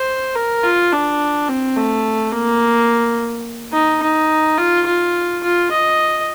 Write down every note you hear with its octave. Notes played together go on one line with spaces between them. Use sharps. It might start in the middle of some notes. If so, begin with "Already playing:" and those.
Already playing: C5
A#4
F4
D4
C4
A3
A#3
D#4
D#4
F4
F4
F4
D#5